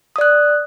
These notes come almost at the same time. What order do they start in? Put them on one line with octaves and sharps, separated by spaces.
D#6 D5 F#6